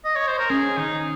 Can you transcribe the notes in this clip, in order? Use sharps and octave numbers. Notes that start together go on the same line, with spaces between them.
D#5
C#5
C5
A#4
C#4 G#4
D#3 D#4